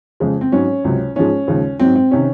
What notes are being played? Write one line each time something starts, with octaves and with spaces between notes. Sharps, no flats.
F2 C#3 G#3
C4
G#2 F#3 C#4
C#2 C3 F#3
G#2 F3 G#3 C#4
D#2 C#3 F3 G#3
G#2 F#3 C4
C4
C3 D#3 C#4